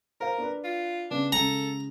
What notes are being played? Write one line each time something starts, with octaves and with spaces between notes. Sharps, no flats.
A#4 C5 F5
D4 B4
F4
C#3 B3 D4
C#3 G#3 A4 A#5